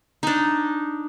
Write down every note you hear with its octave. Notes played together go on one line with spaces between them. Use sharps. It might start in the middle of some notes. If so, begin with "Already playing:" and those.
D4 D#4